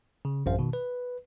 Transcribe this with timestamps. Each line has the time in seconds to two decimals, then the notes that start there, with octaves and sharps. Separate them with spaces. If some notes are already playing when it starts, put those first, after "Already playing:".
0.25 C#3
0.46 A1 F#2 C5 F5
0.59 B2 D#3
0.73 B4